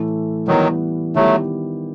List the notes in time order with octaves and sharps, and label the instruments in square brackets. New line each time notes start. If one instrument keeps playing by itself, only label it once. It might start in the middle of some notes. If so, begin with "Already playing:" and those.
Already playing: [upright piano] A2 E3 A3
[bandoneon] D#3 F#3 [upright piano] E3 G3 B3
[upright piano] D#3 G3 B3 E4 G4 [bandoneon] F#3 A3